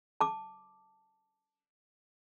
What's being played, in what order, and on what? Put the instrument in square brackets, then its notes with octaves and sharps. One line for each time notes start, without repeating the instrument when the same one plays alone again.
[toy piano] A5 D6